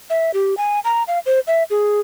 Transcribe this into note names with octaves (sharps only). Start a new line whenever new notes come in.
E5
G4
G#5
A#5
F5
C5
E5
G#4